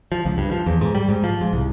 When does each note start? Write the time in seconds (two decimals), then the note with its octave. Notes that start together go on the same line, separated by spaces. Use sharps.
0.12 F3
0.25 C#2
0.38 G2
0.51 F3
0.66 E2
0.81 G#2
0.95 G3
1.09 G#2
1.24 F3
1.41 G#2
1.53 C2